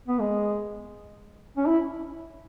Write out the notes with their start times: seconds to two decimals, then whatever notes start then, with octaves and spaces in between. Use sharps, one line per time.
0.08 B3
0.19 G#3
1.57 C#4
1.67 E4